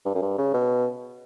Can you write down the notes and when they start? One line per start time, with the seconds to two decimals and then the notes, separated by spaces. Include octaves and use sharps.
0.06 G2
0.15 F#2
0.22 G2
0.38 C#3
0.54 B2